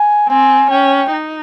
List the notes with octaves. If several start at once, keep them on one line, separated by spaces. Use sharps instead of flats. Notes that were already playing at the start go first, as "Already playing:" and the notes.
Already playing: G#5
C4 G#5
C#4 G5
D#4